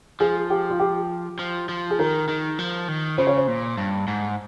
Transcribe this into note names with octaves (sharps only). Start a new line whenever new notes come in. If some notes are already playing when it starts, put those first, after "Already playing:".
F3 G#4
G4
F4
G4
F3
F3
G#4
D#3 A#4
D#3
F3
D#3
C#3 C5
C#5
C5
A#2
G2
G#2